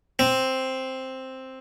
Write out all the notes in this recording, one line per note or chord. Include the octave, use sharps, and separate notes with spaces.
C4